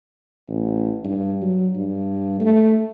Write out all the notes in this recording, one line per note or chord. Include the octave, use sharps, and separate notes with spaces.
A1
G2
F#3
G2
A3